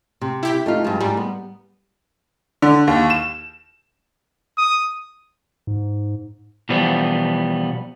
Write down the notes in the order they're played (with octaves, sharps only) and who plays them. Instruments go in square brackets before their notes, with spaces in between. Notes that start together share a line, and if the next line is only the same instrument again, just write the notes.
[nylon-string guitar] C3
[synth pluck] E4 G4 B6
[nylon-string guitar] A3 D#4 F4
G2 F3 G#3
[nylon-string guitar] G#2 [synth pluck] G3
[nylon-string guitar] B3
[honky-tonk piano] D3
D#2
E7
[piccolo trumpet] D#6
[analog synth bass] G#2
[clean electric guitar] B2 E3 F3 G3 B3